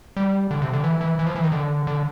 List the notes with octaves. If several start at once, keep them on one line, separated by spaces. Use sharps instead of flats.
G3
D3
C3
D3
E3
E3
E3
F3
E3
D#3
D3
D3